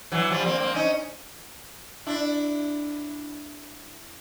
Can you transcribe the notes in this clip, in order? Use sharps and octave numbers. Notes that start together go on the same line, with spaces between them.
E3 F#3
F3 G3
A#3 C4
A#3 C4
C#4 D#4
D4 E4